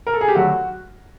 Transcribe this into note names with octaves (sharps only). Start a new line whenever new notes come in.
A#4
A4
G#4
G4
D3 F#3 A3 F#4